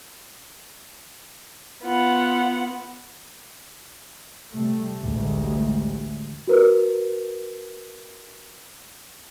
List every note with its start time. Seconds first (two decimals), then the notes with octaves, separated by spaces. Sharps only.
1.84 B3 F4 F#5
4.54 C3 G3 A3
5.02 A1 D2 G3 G#3
6.47 F#4 A#4 B4